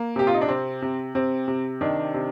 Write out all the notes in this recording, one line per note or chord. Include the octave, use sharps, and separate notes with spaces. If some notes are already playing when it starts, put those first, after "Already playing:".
Already playing: A#3
C3 G4
F4
D#4
D4
C3 C4
C3
C3 C4
C3
D#3 D4
C3